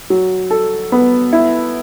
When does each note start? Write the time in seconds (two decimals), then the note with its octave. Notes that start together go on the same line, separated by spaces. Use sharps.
0.10 F#3
0.51 A4
0.92 B3
1.33 E4